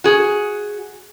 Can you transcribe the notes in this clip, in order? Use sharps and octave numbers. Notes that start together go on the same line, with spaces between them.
F#4 G#4